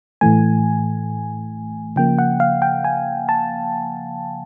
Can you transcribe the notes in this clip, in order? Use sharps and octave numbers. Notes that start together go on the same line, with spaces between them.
A2 E3 A3 G#5
C#3 F3 A#3 G5
F#5
F5
G5
G#5
A5